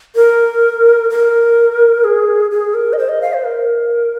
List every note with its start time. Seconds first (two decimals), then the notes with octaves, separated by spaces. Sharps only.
0.16 A#4
1.10 A#4
2.04 G#4
2.51 G#4
2.74 A#4
2.93 D#5
2.98 C5
3.09 D#5
3.22 F5
3.33 C5
3.44 A#4